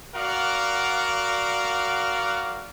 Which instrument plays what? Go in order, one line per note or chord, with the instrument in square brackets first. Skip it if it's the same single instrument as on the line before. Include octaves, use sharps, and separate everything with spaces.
[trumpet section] F#4 A#4 D5 F5 F#5